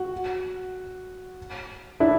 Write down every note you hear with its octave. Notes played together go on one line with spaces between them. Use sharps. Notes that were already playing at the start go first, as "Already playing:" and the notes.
Already playing: F#4
D4 E4